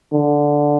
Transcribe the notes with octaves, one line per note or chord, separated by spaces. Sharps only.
D3